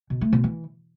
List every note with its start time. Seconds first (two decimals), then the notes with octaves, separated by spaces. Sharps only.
0.10 B2
0.21 A3
0.33 B2
0.44 E3